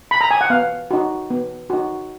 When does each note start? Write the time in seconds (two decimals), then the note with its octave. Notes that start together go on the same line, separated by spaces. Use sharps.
0.11 B5
0.21 A#5
0.31 G#5
0.41 F#5
0.50 B3 F5
0.91 D#4 F#4
1.30 B3
1.70 D#4 F#4